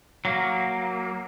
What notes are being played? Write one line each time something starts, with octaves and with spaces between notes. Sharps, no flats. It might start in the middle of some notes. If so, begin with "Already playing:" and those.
F#3 A#3